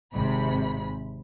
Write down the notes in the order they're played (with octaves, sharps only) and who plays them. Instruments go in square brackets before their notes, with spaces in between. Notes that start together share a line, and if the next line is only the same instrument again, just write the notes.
[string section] G#1 C3 B5